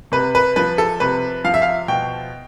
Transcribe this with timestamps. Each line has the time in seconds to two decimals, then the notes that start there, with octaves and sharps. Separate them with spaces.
0.12 C3 B4
0.35 B4
0.56 F3 B4
0.78 A4
1.00 C3 B4
1.44 F3 F5
1.54 E5
1.62 F5
1.88 B2 G5